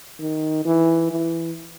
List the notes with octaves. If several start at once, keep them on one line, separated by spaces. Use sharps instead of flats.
D#3
E3
E3